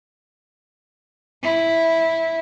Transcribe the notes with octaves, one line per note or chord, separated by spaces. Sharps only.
E4